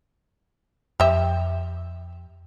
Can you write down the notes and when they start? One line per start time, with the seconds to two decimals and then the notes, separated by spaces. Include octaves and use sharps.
1.00 F2 G4 E5